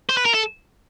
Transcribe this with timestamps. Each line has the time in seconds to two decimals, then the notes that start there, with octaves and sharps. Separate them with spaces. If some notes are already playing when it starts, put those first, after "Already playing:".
0.09 C5
0.17 B4
0.25 A#4
0.34 A4